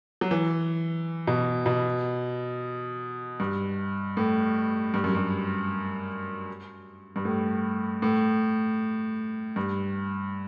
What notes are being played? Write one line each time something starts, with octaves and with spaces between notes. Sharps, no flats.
F#3
E3
B2
B2
G2
A2
G2
F#2
G2
G2
A2
A2
G2